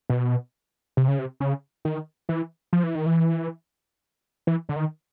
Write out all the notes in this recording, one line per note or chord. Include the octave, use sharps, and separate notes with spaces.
B2
C3
C#3
C3
C#3
D#3
E3
F3
E3
D#3
E3
E3
D3
D#3